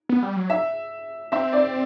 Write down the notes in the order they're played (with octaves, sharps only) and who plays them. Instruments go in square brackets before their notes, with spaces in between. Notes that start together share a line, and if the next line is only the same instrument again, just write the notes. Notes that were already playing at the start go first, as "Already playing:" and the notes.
[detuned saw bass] B3
G3
F#3
[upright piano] E5
[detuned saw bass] C4 [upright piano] E5
[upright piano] D5